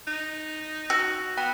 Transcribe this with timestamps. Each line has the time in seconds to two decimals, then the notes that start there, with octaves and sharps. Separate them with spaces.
0.07 D#4
0.90 F#4 E6
1.37 B3 G5